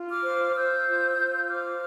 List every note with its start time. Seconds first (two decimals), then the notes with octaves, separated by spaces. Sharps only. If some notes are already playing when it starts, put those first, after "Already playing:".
Already playing: F4
0.10 D6 F6
0.25 C5
0.56 C5 E6 G6
0.87 F4
1.18 F4
1.49 C5 D6 F6